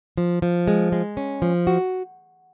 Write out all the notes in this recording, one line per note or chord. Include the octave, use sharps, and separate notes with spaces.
F3
F3
G#3
G#3
C#4
F3
F#4